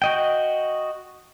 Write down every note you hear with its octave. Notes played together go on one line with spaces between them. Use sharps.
F#4 D#5 G5